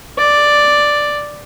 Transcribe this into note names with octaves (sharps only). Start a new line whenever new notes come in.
D5